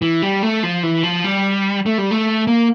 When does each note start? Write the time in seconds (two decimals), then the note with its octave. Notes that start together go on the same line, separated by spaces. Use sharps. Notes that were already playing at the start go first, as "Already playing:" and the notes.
0.02 E3
0.22 G3
0.43 A3
0.63 F3
0.83 E3
1.03 F3
1.24 G3
1.86 A3
1.98 G3
2.11 A3
2.47 A#3